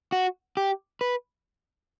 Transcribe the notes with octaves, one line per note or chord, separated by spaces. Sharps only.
F#4
G4
B4